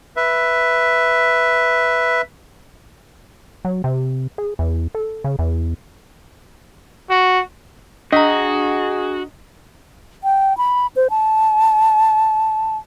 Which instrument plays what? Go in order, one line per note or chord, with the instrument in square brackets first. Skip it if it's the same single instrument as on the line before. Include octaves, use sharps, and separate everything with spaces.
[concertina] B4 E5
[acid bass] F#3
C3
G#4
E2
A4
C#3
E2
[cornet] F#4
[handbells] D4 A#5 [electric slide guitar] F#4 [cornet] G#4 [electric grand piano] D#5
[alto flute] G5
B5
C5
A5